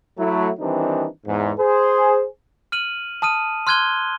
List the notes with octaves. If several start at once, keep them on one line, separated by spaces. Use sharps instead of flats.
F#3 A3 E4
D#3 E3 G3 C4 D4 D#4
E2 G#2
G#4 C5
F6 D#7 F#7
A5 D#6 F6 D#7
C6 F6 F#6 G#6 D#7 G7